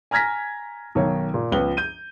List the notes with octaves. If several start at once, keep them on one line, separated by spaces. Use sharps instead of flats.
G#5 A#5 F6 G#6 A#6 B6
B1 D#3 C#5
A#2
C#2 F3 B3 G7
G6 D#7